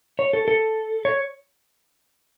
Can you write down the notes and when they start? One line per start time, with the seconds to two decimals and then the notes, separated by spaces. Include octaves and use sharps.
0.19 C#5
0.33 A4
0.48 A4
1.05 C#5